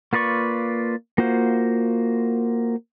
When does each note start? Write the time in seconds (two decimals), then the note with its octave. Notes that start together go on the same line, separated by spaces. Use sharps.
0.13 A#3 F4 B4 D5 C#6
1.18 A#3 F4 F#4 C5